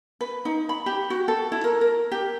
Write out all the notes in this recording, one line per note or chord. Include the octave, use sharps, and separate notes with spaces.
B4
D#4
B5
G4
F#4
A4
E4
A#4
A#4
G4